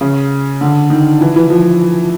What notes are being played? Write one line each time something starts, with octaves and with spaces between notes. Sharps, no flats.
C#3
D3
D#3
E3
E3
F3